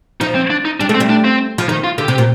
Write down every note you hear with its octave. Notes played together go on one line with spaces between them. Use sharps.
F3 D#4
C4
D4
D#4
G3 D4
A3
C4
G3
D4
C4
F3
D#3 D#4
F4
D3 G4
C3
A#2